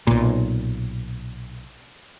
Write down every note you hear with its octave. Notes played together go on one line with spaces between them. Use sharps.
B1 A#2